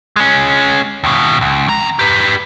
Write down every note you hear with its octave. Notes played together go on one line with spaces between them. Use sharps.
G#3 C#4
D#2 B2
C#2
F2 A#5
G4 B4